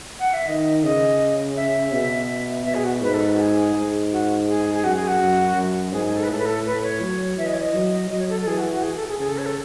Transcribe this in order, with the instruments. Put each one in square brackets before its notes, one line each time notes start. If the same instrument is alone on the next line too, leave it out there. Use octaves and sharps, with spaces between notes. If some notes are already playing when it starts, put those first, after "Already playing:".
[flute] F#5
E5
[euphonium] D#3 [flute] D#5
[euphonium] C#3 [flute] D#5
[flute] E5
[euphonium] B2 [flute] E5
[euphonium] B2 [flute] E5
[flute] G#4
F#4
[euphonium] G#2 [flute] B4
[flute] A4
B4
F#4
G#4
[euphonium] G#2
[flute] F#4
G#4
G#4
[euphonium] F#2 [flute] F#4
[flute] G#4
F#4
[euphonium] F#2
F#2
[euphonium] G#2 [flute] G#4
[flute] G#4
A4
B4
[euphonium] A2 [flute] A4
[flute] B4
A4
[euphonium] A2 [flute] B4
[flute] C#5
[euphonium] F#3
[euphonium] E3 [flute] E5
[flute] D#5
C#5
D#5
[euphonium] F#3
[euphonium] F#3 [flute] D#5
[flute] C#5
A4
A4
[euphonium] E3 [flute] G#4
[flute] F#4
F#4
G#4
A4
G#4
[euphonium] C#3 [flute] G#4
[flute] A4
C#5
A4